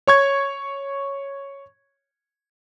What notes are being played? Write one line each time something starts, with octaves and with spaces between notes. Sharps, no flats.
C#5 C#6 G#6